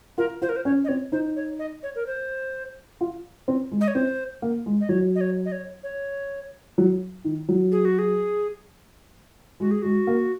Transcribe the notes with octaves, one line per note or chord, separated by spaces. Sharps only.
F4 A#4
F4 C5
A#4
C5
C#4 C#5
D#5
C4 C#5
D#4 C5
C#5
D#5
C#5
A#4
C5
F4
C4
G#3
D#5
C#5
C4 C5
A#3
G#3
D#5
F#3 C#5
D#5
C#5
D#5
C#5
C#5
F#3
D#3
F#3
G#4
F#4
G#4
G#3 F#4
G#4
G#3 F#4
A#3